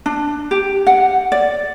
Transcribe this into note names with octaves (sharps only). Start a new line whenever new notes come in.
D4
G4
F#5
D5